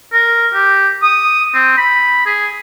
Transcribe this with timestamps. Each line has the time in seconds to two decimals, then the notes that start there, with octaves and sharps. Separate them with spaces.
0.13 A#4
0.53 G4
1.03 D#6
1.54 C4
1.77 B5
2.26 G#4